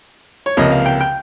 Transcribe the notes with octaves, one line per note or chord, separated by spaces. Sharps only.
C#5
C#2 C3 F3 A#3 D#5
F5
G5
G5